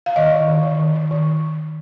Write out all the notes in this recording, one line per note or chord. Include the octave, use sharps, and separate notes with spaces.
F5
D#3 D#5
D#3
D#3
D#3
D#3
D#3
D#3